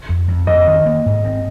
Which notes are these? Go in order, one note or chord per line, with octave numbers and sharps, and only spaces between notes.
F2
F2
F2 D#5
D#3
A#3
G#2
C4